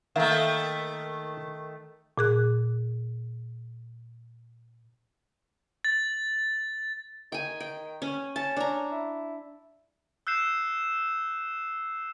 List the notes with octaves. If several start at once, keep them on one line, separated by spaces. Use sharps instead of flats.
D#3 A3 A#3 E5
A#2 G#4 F#6
A6
D#3 G5 G#5
G5
C#4
C#4 A5
D4 A#5
E4
E6 F#6 G6 C7 E7